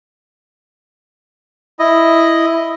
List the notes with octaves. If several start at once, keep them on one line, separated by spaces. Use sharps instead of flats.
E4 D#5